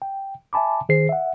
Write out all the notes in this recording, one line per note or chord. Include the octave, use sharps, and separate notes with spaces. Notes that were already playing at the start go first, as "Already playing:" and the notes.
G5
E5 G#5 A5 B5 D6
D#3 G#4 C5 C7
E5 F#5